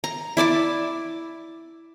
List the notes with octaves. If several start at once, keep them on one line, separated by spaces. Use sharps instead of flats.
A#5
E4 D5 A5 D6